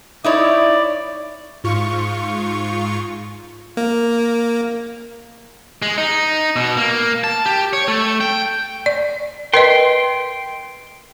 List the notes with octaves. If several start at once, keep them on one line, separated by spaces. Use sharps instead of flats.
D#4 E4 C#5 D5
G#2 F4 C#6
A#3
G#3
D#4
B2
A#3
A5
G4
C#5
A3
G5
D5
A#4 B4 D#5 G5 C6